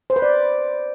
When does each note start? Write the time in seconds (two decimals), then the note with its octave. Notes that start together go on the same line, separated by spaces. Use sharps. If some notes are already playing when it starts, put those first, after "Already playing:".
0.10 C5
0.16 B4
0.22 D5